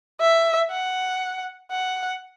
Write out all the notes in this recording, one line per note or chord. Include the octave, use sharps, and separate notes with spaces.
E5
F#5
F#5